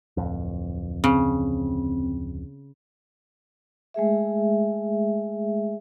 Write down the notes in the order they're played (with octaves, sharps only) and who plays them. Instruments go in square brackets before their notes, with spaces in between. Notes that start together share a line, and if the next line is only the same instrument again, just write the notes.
[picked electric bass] D1 F2
[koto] C#3 [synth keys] C4
[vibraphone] G#3 A3 G#4 E5